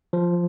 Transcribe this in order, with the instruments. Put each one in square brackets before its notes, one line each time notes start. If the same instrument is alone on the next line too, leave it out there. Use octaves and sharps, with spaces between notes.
[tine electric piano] F3